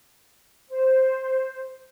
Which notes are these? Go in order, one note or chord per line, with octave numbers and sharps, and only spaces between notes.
C5